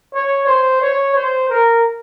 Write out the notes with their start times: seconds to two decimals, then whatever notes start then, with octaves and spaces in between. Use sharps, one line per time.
0.14 C#5
0.47 C5
0.82 C#5
1.15 C5
1.50 A#4